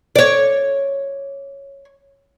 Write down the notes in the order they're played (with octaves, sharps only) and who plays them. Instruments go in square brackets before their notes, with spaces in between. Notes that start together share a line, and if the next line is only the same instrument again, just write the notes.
[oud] C#5 D5